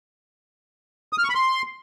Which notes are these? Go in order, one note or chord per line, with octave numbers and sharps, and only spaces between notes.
D#6
F6
C#6
B5
C6